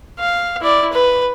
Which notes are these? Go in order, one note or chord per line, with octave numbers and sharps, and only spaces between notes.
F5
E4 D5
B4